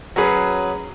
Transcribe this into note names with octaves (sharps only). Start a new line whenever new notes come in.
F#3 C#4 G#4 B4